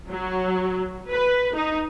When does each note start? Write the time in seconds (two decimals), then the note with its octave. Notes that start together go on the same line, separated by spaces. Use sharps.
0.10 F#3
1.10 B4
1.54 D#4